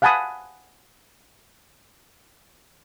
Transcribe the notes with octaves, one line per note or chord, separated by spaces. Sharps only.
F5 F#5 G#5 A5 B5 D#6